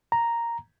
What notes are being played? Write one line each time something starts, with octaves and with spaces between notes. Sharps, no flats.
A#5